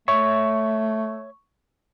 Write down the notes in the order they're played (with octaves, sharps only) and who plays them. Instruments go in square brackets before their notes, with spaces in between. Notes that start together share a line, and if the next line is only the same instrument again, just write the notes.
[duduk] A3 [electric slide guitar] C#5 E5 [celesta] C#6